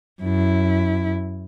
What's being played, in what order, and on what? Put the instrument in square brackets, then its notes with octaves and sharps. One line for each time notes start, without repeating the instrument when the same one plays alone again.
[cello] F#2 E4